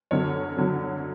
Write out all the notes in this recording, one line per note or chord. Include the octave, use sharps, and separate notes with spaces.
F#2 D3 F#3 C#5
F#2 D3 F#3